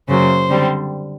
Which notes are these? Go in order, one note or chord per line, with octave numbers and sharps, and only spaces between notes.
F#2 C#3 F#3 A#3 C5
D3 G3 C4